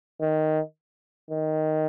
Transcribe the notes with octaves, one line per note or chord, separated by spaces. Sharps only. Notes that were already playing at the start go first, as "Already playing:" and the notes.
D#3
D#3